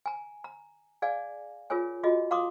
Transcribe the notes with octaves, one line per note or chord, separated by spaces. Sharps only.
G#5 A#5
A#5
G#4 D5 F5 G#5
F4 G#4 A#4 C#5 G#5
F4 F#4 G#4 D#5
F5 A#5 C6 D6 D#6